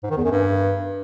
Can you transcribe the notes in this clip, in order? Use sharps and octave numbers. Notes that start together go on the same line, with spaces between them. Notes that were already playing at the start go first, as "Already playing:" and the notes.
G#2
D#3
E2
F#2
G2